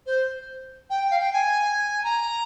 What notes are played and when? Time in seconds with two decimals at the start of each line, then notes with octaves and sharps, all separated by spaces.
0.06 C5
0.90 G5
1.10 F5
1.19 G5
1.33 G#5
2.03 A#5